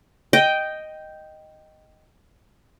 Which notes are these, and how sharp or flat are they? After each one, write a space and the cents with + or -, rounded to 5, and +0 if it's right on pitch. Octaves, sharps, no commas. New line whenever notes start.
D#5 +0 G5 -5